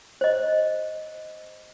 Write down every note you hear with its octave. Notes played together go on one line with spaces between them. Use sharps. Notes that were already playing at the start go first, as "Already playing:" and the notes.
C5 D#5